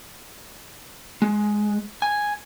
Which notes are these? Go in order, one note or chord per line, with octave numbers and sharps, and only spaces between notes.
G#3
G#5